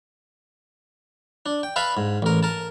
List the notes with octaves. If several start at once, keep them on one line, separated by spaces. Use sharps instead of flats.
D4
G5
B4 E5 F5 A5 B5
G#2
A1 A#4
A#4 A5